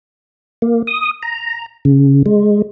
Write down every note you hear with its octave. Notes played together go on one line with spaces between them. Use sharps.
A#3
D#6
A#5
C#3
G#3